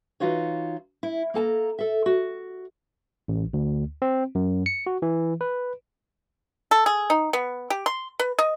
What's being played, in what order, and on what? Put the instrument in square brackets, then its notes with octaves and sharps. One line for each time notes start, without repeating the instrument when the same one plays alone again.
[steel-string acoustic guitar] E3 D#4 F4 F#4 C#5
E4
A#3 A4 A5 A#5
A4 E5
F#4
[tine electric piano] A1
D2
C4
F#2
C#7
F#4
E3
B4
[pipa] A4
G#4
D#4
B3
G4
C6
B4
D#5